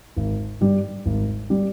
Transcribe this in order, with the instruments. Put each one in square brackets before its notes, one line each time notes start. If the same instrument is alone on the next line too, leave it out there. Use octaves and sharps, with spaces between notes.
[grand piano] G#1
G2 G3
G#1
G3